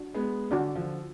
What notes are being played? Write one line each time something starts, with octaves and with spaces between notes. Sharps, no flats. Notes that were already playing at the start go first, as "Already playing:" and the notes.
Already playing: D4 F#4
G#3 B3
D3 D4 F#4 D5
D3 F3